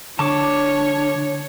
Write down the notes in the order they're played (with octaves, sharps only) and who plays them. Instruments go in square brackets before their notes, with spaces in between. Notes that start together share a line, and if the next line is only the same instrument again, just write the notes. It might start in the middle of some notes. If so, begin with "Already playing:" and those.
[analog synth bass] D3 [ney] D4 [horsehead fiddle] C#5 [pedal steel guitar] A5 C#6 D6